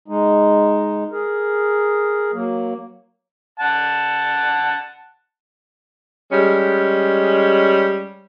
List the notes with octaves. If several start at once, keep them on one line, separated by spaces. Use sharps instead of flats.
G#3 D#4
G#4 A#4
F#3 A#3
F#5 A5
G3 G#3 C#4